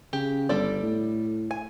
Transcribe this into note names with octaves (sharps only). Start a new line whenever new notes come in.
C#3 G4
G1 G3 A4 D5
A2
G#5